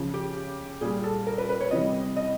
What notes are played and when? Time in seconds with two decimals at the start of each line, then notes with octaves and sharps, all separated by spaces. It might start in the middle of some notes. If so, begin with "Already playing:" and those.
Already playing: C#3 F3
0.14 G4
0.81 A#2 G3 G#4
1.04 A4
1.27 A#4
1.38 B4
1.49 B4
1.60 C#5
1.71 C3 E3 G3 D#5
2.17 D#5